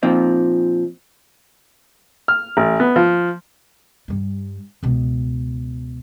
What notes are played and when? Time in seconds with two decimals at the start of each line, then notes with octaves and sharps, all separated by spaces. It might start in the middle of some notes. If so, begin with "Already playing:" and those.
0.03 A#2 F3 C4 D#4
2.28 F6
2.57 A1
2.80 B3
2.96 F3
4.08 G2 G3
4.83 C#2 B2